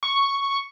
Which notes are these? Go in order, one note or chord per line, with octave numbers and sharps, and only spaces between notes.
C#6